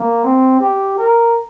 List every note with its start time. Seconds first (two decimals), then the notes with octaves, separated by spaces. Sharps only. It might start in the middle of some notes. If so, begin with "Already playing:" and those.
Already playing: A#3
0.24 C4
0.60 G4
0.98 A#4